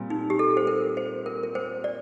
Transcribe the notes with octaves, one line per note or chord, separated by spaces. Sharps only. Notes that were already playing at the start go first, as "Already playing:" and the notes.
Already playing: A#2 G3 C4
D#4
G4
A4
C5
A#4
C5
A#4
A#4
C5
D5